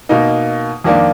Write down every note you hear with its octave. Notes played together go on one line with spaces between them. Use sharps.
B2 A#3 D#4
F2 D#3 A#3 D4